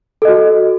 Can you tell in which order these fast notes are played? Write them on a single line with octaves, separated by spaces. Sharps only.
A4 D#5 F#4